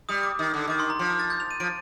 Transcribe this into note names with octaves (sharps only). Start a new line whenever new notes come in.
G3 D#6
D6
D#3
D3
D#3 D6
C6
A#5
F3 C6
D6
A6
G6
F7
D#7
F3 D7